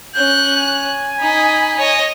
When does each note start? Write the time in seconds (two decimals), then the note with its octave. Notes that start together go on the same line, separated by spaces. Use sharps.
0.15 C#4 F#6 G6
0.57 G#5
1.21 D#4 D#5 B5
1.79 C#5 D#5